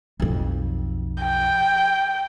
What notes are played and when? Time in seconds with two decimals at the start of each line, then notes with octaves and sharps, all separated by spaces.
0.20 B1 F2
1.22 G5